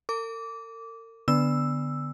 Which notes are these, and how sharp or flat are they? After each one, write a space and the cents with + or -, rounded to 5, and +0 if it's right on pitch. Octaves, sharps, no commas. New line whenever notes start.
A#4 -45 D6 -20
D3 +0 B3 +0 E6 +0